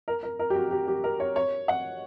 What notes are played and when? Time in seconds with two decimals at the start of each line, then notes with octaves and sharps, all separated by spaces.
0.08 A#4
0.23 A#4
0.39 A#4
0.50 G4
0.56 F#4
0.71 G4
0.88 G4
1.04 A#4
1.20 C#5
1.36 C#5
1.68 F#5